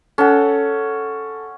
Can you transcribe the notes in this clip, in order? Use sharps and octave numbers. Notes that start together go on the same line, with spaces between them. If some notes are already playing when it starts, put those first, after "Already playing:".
C#4 A4 F#5